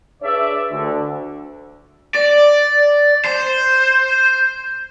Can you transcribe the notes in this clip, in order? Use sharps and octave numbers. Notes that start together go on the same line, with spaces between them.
D4 G#4 B4 C#5 D5 E5
D2 D3
D5
C5